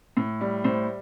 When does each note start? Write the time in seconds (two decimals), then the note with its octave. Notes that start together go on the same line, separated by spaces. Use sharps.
0.17 A2
0.41 G3
0.64 A2 C5